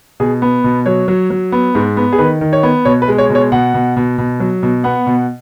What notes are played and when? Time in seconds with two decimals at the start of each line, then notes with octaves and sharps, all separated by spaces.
0.20 B2 G#4
0.42 B3
0.64 B2
0.86 F#3 C#5
1.08 F#3
1.30 F#3
1.52 B3
1.75 G#2
1.97 B3
2.13 G#4
2.19 D#3 B4
2.41 D#3
2.53 C#5
2.63 B3
2.85 B2 C#5
3.02 B4
3.08 G#3
3.18 C#5
3.30 B2
3.35 C#5
3.52 B2 F#5
3.74 B2
3.97 B2
4.18 B2
4.40 F#3
4.63 B2
4.84 B3 F#5
5.07 B2